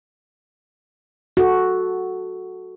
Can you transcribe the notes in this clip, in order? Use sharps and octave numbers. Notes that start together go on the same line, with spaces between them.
F#4 A4